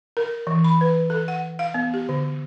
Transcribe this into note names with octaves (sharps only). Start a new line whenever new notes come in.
A#4
E3
B5
B4
A4
F#5
F5
B3
G4
D3